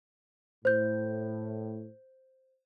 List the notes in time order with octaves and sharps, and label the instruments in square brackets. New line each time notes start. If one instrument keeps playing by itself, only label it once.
[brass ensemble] A2 [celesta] C5 G6